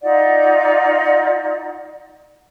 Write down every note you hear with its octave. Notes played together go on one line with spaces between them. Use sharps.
D#4 F4 D5 F#5